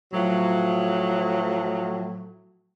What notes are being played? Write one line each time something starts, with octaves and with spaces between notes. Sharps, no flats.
A2 F3 F#3